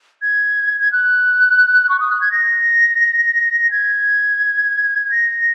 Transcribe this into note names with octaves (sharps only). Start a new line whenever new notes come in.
G#6
G#6
F#6
C#6
D#6
F#6
G#6
A#6
G#6
A#6